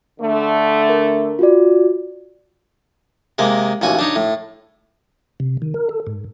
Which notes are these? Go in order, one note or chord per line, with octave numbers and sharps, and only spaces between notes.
D3 A3
A#4
F4 F#4 D5
C3 G#3 A#3
A1 D#2 F#4 G#5
D4 D#4 C#5
A2
C3
D#3
A#4
A4
G#2